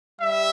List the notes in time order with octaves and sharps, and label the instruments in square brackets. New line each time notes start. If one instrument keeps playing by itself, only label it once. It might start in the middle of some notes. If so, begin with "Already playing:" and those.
[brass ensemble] G3 E5